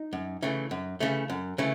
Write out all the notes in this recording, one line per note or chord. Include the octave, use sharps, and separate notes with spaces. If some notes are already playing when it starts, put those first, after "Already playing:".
Already playing: D#4
F#2
C#3 E3 A3
F#2
C#3 E3 A3
F#2
C#3 E3 A3